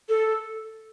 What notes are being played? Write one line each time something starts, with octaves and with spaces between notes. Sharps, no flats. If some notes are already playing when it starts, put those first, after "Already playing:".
A4